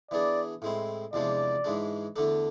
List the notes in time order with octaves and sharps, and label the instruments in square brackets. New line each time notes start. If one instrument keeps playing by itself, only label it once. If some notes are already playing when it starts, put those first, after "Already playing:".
[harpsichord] E3 B3 D4 G#4 [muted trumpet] D5
[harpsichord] A2 G#3 C4 E4
[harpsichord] E2 C3 F3 G#3 D4 [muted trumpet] D5
[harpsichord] G#2 E3 G#3 D4
E2 D3 A3 D4 A4